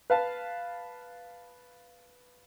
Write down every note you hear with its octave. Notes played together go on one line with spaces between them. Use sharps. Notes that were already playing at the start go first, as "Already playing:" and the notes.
B4 F5 A5